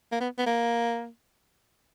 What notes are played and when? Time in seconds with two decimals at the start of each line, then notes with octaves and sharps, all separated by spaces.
0.12 A#3
0.21 B3
0.38 B3
0.46 A#3